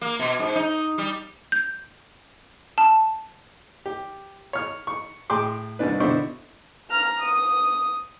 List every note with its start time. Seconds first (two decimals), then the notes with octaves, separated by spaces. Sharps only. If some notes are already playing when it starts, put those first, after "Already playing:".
0.01 A#3
0.19 B2
0.39 G#2
0.56 D#4
0.98 G3
1.52 G6
2.78 A5
3.86 G4
4.53 C#5 F6
4.87 C#6
5.30 A2 G#4 G5 C6 D6
5.79 C2 D#3 C#4 D4 B4
6.00 B2 D3 D4 E4 C5 C#6
6.91 A#5 F6
7.21 D#6